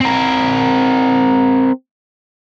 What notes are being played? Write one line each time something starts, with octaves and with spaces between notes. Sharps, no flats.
C4 A#4